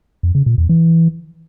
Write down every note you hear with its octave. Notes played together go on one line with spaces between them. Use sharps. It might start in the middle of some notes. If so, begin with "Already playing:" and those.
F2
C#3
A#2
E2
E3